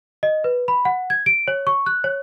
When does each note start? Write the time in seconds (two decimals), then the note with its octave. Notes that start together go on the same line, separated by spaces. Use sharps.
0.23 D#5
0.44 B4
0.68 B5
0.85 F#5
1.10 G#6
1.26 D7
1.48 C#5
1.67 C#6
1.86 F#6
2.04 C#5